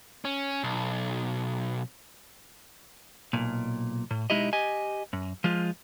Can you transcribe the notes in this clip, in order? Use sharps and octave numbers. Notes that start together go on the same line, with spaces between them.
C#4
B1
B1 A#2
A2
B1 G#3 D#4 E4 G4 D#5
G4 D#5 G#5
F#2
F3 G#3 F4